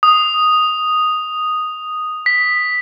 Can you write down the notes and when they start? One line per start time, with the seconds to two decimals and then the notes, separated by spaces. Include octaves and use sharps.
0.03 D#6
2.26 B6